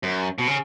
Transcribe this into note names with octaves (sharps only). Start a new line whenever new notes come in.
F#2
B2
C#3